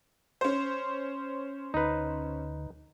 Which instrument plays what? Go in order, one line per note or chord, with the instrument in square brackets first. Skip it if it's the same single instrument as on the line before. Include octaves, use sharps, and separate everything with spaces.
[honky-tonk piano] C#4 C5
[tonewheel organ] D2 [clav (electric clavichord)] D#4 B4